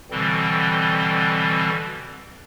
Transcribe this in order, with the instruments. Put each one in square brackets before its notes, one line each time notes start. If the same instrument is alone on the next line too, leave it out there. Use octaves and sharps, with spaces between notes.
[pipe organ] B2 D3 E3 G3 C4